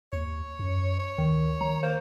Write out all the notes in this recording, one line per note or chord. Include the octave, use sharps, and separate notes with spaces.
D#2 C#5
F#2
C#5
D2 D#3
D#3 A#5
A#3 C5